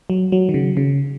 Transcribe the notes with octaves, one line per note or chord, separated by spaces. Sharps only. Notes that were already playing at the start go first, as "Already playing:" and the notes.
F#3
F#3
D#3
C#3
C#3